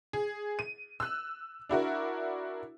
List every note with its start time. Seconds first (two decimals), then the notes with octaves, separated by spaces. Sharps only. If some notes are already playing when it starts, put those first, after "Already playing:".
0.13 G#4
0.59 D#7
1.00 E6 F#6
1.69 D4 E4 F#4 A#4